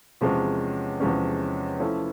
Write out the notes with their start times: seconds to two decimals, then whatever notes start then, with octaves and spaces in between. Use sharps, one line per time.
0.21 E2 C3 F3 G#3 C#4
1.00 E2 C3 F3 G#3 C#4
1.80 F3 A3 C#4 E4